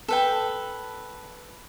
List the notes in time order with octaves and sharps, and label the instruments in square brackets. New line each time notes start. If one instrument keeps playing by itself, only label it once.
[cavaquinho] A4 B4 G5